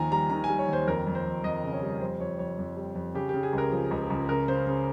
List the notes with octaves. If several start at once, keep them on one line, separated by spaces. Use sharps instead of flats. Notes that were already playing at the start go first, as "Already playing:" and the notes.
Already playing: D#2 D#3 F3 G#5 A#5
G3 A#5
D#3 A#5
G#5
G3
C#5
D#2 C5
F2 A#4
F2
C5
F2
F2 D#5
C#3
C#5
G3
F2 C5
F2 C#5
F2 C#5
F2
G3
F2
C#3 G4
C#3 G4
G#4
C#2 A#4
F3
C#2
C#2
C#3 A#4
C#3 C5
C#3